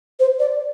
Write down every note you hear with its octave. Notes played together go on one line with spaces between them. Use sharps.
C5
D5